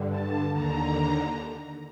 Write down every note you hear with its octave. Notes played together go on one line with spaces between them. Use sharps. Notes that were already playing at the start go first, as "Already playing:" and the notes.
Already playing: G2 D3
A5
D#2 D3 A#5